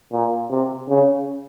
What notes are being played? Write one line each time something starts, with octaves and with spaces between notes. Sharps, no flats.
A#2
C3
C#3